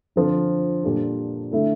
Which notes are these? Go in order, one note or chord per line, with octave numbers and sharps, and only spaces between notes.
D3 F3 C4 F4 A4
A#2 G3 D4 F4 A4
D3 A3 E4 A4